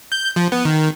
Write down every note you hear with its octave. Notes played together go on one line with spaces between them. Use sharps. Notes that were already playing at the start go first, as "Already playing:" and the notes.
G6
F3
B3
D#3